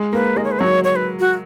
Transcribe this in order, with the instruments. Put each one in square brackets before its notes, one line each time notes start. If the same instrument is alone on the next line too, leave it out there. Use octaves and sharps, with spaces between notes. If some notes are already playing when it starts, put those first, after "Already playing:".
Already playing: [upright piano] G#3
[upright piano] A#3 [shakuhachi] B4
[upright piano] G#3 [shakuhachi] D#5
[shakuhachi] C#5
B4
[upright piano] F#3 [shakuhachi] C#5
[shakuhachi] C#5
B4
F#4